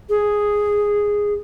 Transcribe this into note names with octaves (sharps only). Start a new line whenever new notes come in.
G#4